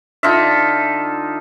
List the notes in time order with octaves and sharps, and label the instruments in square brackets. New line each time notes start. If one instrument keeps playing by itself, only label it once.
[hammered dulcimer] D3 D#4 F4 E5